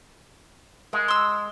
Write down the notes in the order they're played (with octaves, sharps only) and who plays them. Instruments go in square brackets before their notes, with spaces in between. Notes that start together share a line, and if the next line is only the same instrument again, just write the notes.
[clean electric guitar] G#3 [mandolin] A#4
[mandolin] C6 E6